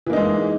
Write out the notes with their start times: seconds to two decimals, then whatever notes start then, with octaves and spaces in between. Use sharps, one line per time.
0.06 E3
0.10 A#3
0.13 D#4
0.16 G#3